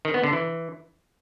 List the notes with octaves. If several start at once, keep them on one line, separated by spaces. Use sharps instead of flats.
D#3
B3
D3
E3